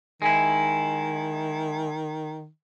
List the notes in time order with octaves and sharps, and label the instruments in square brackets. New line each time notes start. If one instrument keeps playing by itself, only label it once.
[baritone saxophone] D#3 [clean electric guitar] G#3 E4